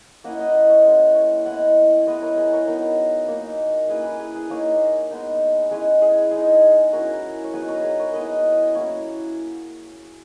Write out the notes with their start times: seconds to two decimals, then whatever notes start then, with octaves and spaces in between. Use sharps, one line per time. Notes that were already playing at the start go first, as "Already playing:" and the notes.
0.24 A#3 C#4 E4 D#5 F#5
0.39 D#5 F#5
0.55 D#5 F#5
0.70 C#5 E5
0.85 G#3 C#4 E4
1.15 C#5 E5
1.45 G#3 B3 E4 D#5 F#5
2.07 G#3 B3 E4 B4 D#5
2.22 A#4 C#5
2.38 G#4 B4
2.53 A#4 C#5
2.67 F#3 B3 D#4 A#4 C#5
3.28 A#3
3.33 D#4
3.89 A#3 C#4 E4 G#4 B4
4.04 G#4 B4
4.20 G#4
4.34 G#4 B4
4.49 A#3 D#4 A#4 C#5
5.10 G#3 B3 D#4
5.71 G#3 C#4 E4 G#4 B4
6.02 G#4
6.31 G#3 D#4 G#4
6.92 F#3 C#4 E4 F#4 A#4
7.44 C#5
7.53 F#3 B3 D#4 G#4 B4
7.68 A#4 C#5
7.84 G#4 B4
7.99 A#4 C#5
8.13 G#3 B3 E4 B4 D#5
8.74 F#3 A#3 C#4 E4 C#5 E5